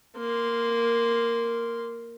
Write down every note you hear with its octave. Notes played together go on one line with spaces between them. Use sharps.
A#3 C6